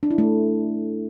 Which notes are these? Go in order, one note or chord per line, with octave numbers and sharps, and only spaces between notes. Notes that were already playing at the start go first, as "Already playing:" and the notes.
D4
E4
A3